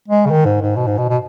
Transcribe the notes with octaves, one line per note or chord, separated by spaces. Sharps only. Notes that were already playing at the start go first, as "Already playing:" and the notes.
G#3
C#3
D#3
G#2
G#2
B2
G#2
B2
B2